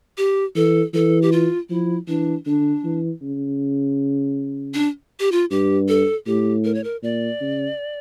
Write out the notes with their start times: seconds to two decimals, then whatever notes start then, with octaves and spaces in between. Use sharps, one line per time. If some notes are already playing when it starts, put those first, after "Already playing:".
0.18 G4
0.56 E3 A4
0.94 E3 A4
1.22 G4
1.32 F4
1.70 F3 E4
2.08 E3 D4
2.46 D3 D4
2.84 E3
3.22 C#3
4.74 D4
5.20 G4
5.32 F4
5.51 G2 G4
5.89 A4
6.27 A2 G4
6.65 A#4
6.75 C#5
6.84 A#4
7.03 A#2 D5
7.41 C#3